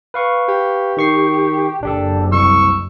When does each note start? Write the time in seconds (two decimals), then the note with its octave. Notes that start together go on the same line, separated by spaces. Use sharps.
0.14 B4 F5 C#6
0.48 G4
0.97 D#3 C#6 C7
1.83 F#1 D4 G4 A4
2.32 C2 C#6 E6